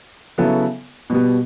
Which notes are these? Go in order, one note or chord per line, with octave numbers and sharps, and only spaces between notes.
C#3 F#3 B3 E4 A4
B2 G3 B3